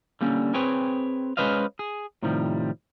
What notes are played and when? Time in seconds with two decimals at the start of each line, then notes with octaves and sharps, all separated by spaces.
0.21 D3 G3 A#3 C#4
0.54 C4 G#4 B4 C#5 G5 G#5
1.37 G#3 C#4 B4 C5 D#5 F5
1.79 G#4
2.23 A2 C3 D#3 F3 G3